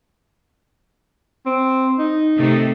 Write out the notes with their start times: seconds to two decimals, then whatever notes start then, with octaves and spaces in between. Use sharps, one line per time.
1.46 C4
1.99 D#4
2.37 C3 D#3 A3